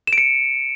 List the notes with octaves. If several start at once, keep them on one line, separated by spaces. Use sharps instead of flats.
E7
D7
C#7